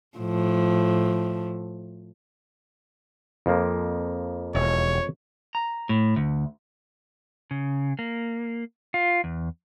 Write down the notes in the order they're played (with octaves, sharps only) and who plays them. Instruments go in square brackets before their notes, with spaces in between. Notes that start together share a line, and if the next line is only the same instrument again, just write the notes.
[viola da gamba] A2 F3
[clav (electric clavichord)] F2 F3 A#3
[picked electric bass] E1 [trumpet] C#5
[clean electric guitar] A#5
A2
D2
[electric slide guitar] C#3
A#3
F4
E2